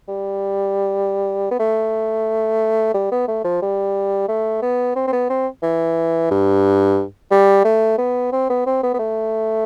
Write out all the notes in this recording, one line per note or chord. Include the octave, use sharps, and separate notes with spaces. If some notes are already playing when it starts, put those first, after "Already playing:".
G3
B3
A3
G3
B3
A3
F3
G3
A3
B3
C4
C4
B3
C4
E3
G2
G3
A3
B3
C4
B3
C4
B3
B3
A3